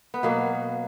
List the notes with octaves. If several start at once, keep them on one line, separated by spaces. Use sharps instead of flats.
B3
B2 F#3 A#3